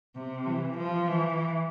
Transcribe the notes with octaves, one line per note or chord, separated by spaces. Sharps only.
C3
E3
F3
E3